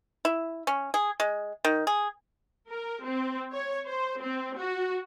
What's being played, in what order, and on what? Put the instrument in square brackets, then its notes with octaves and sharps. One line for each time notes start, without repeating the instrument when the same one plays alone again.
[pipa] E4
C#4
G#4
G#3
D#3
G#4
[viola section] A#4
C4
C#5
C5
C4
F#4